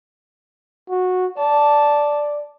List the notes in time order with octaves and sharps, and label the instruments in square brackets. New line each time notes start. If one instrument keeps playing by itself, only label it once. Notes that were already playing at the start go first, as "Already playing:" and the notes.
[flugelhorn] F#4
[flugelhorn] D5 [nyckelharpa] A5